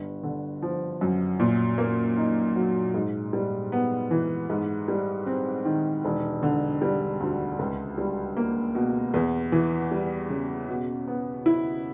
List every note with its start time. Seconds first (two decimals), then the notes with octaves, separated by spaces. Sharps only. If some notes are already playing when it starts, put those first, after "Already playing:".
Already playing: G1
0.23 D3
0.62 F3
1.01 F#2
1.40 A#2
1.78 A#3
2.17 D#4
2.56 F#3
2.94 G#2
3.33 G3
3.72 B3
4.11 E3
4.50 G#2
4.88 G3
5.27 C4
5.65 D#3
6.05 E1
6.43 D3
6.82 G3
7.20 D2
7.59 C#2
7.98 G3
8.37 A#3
8.75 B2
9.14 E2
9.52 E3
9.91 G3
10.30 C#3
10.69 B2
11.08 B3
11.46 E4